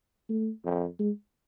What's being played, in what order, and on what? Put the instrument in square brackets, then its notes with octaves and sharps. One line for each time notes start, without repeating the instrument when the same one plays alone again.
[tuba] A3
[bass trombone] F2
[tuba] G#3